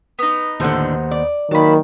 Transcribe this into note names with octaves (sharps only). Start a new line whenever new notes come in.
B3 D#4
D#2 A2 D3 C5 F#5
D5
D#3 F#3 A#3 A5 B5